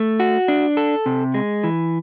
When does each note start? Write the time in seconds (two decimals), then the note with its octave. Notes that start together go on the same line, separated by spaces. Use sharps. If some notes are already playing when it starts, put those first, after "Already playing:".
Already playing: A3
0.20 F#4
0.48 D4
0.77 A4
1.06 C3
1.34 G#3
1.64 E3